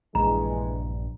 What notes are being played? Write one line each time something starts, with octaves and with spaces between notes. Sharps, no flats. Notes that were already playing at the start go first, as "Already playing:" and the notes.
A#1 G2 E3 G#3 A#5